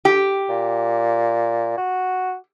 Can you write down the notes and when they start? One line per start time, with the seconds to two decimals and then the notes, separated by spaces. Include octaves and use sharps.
0.05 G4
0.49 A#2
1.78 F#4